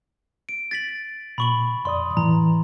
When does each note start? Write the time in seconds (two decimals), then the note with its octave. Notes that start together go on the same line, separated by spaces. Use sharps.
0.49 D7
0.71 A6 B6 F#7
1.38 A#2 B5 C#6 F#7
1.85 F2 D5 C6 D#6
2.17 A2 E3 A#5